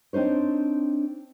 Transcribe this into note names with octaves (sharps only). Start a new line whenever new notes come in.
C4 D4 D#4 C5 C#5